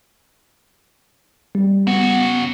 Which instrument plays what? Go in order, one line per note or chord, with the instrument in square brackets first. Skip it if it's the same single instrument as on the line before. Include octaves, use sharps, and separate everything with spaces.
[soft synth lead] G3
[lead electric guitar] C#3 F#4 [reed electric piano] B3